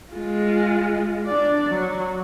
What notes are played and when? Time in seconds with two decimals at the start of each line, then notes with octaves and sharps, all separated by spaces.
0.13 G#3 F4
1.26 D4 D5
1.69 F#3